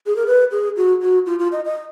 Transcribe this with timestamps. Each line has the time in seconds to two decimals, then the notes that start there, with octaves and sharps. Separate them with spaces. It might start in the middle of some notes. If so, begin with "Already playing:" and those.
0.06 G#4
0.16 A#4
0.27 B4
0.51 G#4
0.77 F#4
1.01 F#4
1.26 F4
1.39 F4
1.52 D#5
1.65 D#5